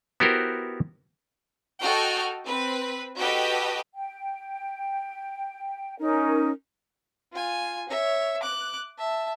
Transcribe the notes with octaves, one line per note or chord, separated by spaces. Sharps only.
B3 E4 F#4 G4 A#4 C5
F#4 A4 D#5 G5 F6
C4 B4
F#4 G4 A4 B4 D#5 G5
G5
C#4 D#4 A#4
F4 G#5
C#5 E5
D6 F#6
E5 A5